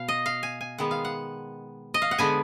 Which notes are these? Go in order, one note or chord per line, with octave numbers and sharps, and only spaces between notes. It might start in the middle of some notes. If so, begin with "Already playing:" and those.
Already playing: B2 F5
D#5
F5
G#5
G#5
D#3 G#3 B3 F#5
F5
F#5
D#5
F5
F#5
D3 G#3 B3 G#5